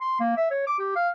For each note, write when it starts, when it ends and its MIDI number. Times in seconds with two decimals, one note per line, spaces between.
0.01 0.19 84
0.20 0.34 58
0.37 0.46 76
0.51 0.67 73
0.67 0.77 86
0.79 0.95 67
0.96 1.09 77